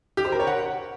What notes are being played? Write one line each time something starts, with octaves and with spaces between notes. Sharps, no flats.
G4
C5
A#4
C#5
F#5